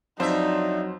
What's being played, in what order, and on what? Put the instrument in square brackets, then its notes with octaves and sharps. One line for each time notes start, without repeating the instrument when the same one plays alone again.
[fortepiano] F2 C5 [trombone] F#3 [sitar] D4 E5 [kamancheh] D#4